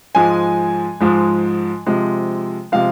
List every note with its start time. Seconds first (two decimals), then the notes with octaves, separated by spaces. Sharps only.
0.15 G#2 F3 G#3 G#5
1.00 G#2 F3 G#3
1.87 C3 F3 G#3
2.72 C3 F3 G#3 F5